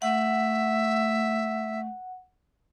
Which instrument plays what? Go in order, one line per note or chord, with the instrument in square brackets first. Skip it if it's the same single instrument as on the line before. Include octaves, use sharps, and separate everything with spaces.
[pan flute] A3 [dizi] E5 [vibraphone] F#5